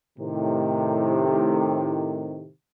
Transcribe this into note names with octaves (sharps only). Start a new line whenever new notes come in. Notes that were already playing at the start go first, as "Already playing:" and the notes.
A2 C3 D#3